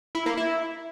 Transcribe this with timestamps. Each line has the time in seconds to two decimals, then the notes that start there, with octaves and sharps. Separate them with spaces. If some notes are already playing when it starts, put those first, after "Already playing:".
0.15 E4
0.26 A#3
0.37 E4